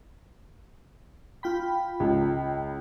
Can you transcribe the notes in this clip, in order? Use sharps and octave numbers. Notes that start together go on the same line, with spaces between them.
F4 G5 B5
C#2